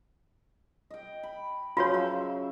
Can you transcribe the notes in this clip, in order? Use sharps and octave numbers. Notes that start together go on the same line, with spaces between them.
D#5 G5
B5
C#3 F3 F#3 F4 F#4 C#5
E5